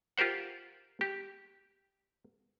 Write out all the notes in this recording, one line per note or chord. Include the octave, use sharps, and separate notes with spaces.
F4 G4 A#4 C5 F#5
G4